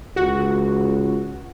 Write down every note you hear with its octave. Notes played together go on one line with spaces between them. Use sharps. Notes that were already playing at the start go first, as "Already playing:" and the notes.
C#2 F#4